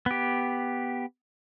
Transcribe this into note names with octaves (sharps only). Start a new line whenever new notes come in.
B3 G4